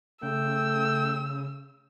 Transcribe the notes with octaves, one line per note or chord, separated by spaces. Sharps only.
C#3 A3 G5 E6